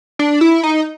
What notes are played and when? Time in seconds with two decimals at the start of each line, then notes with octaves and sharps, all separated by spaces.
0.19 D4
0.41 E4
0.63 D#4